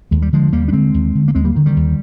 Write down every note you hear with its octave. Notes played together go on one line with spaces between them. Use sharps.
D#2 G#3
G3
D3 F3 G#3
D#2 G3 A#3
D4
D3 G#3 C4
D#2
D3
A#3
D#2 G#3 C4
G3 A#3
D3 D#3
D#3 G3
D#2